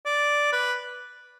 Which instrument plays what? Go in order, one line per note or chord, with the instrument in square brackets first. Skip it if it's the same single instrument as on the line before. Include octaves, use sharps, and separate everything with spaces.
[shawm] D5
B4